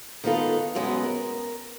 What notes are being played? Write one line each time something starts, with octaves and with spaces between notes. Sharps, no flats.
D#3 G#3 B3 F4 A4
F#2 B2 G#3 B3
A#4